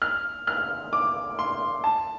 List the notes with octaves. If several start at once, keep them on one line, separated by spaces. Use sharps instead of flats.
F6
F6
D6
C6
A5